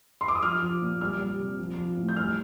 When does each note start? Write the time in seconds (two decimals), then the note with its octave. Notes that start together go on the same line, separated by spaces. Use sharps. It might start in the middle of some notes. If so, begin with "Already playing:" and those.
0.21 C6
0.28 D6
0.35 D#6
0.42 F3 F6
0.62 F3
0.82 A#2
1.01 G3 F6
1.20 G3
1.39 C3
1.59 F3
1.78 F3
1.97 A2
2.09 G6
2.16 G3 F6